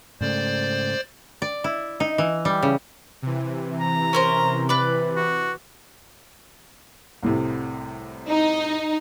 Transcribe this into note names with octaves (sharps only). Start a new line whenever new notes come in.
G#2 C#3 A3 C5 D5
D5
E4
D#4
E3
G3
C#3
C3 E3
A#5
C#4 A#4 C5
B4 D5
F#4
C2 A2 C3
D#4